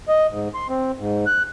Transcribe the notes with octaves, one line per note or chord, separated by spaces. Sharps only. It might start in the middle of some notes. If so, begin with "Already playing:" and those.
D#5
G#2
C6
C4
G#2
F#6